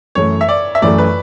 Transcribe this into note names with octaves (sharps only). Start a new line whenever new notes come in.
F#2 E3 A3 C#5
E5
D5
E5
F#2 E3 A3 D5
B4